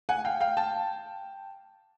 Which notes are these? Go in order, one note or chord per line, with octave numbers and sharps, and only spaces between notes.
F#5 G#5
F5 G5
F5 G5
G5 A5